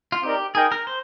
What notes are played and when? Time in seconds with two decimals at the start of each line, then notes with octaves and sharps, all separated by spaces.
0.12 F4
0.23 C4 D#4 G4 A#4 D5
0.55 D#4 G#4 A#4 D#5 G5
0.72 A#4
0.87 C5